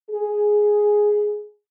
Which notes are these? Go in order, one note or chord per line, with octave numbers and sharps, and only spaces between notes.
G#4